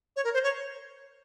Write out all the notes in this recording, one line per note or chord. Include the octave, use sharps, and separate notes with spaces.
C#5
A#4
C5
C#5